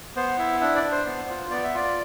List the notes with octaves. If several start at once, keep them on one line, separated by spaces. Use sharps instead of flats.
B3 C5
E4 E5
D4 E5
D5
D4
C5
B3
F4
B3 D5
E5
F4 D5